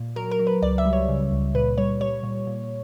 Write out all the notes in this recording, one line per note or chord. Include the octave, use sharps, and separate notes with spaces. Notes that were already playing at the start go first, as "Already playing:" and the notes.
Already playing: A#2
F#3 A#4
A#4
F#3
B4
C#2 D5
E5
G3
C#5
C#3
C#2
A#2 B4
G3 C#5
G3 C#5
A#2
A#2